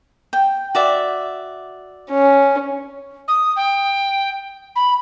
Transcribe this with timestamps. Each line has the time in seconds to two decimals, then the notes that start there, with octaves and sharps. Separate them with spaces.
0.33 G5
0.75 F#4 D5 E5
2.11 C#4
3.28 D#6
3.56 G5
4.76 B5